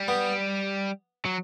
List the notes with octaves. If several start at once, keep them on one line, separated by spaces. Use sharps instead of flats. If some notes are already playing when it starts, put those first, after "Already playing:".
Already playing: G3
B3
F#3